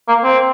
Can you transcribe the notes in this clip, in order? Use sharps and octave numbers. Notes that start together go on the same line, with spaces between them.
A#3
C4